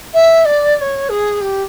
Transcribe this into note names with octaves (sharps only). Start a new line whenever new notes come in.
E5
D5
D5
C#5
G#4
G4